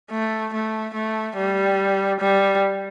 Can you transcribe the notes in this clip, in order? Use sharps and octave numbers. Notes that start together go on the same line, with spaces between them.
A3
A3
A3
G3
G3